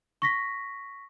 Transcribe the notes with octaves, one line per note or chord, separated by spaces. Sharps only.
C#6 A#6 B6